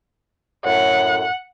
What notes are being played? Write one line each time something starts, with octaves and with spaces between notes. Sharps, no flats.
F#2 A2 F#5